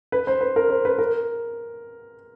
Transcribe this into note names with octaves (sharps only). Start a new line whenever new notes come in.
B4
C5
B4
A#4
C5
B4
A#4